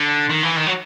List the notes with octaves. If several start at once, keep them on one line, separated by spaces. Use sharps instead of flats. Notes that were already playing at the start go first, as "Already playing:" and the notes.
Already playing: D3
D#3
E3
D#3
F#3